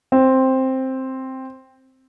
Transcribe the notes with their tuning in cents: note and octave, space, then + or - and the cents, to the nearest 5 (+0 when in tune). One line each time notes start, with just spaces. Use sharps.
C4 +5